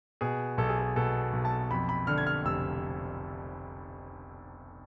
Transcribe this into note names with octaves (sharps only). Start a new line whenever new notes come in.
B2 G#4
B1 A4
G#4
A4
B2 A4
B1
A5
F2 B5
B5
D3 F6
G#6
F6
F1 E6